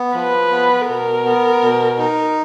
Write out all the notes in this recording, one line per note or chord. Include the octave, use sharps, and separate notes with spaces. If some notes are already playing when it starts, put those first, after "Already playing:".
Already playing: B3
F3 B4
B3
B2 A#4
B3
B2
D#4